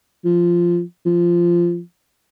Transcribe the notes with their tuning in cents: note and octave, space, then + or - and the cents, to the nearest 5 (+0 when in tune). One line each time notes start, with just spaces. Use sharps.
F3 -10
F3 -15